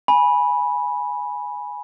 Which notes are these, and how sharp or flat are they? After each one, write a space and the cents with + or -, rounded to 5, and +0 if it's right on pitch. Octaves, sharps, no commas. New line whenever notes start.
G#5 +0 B5 -10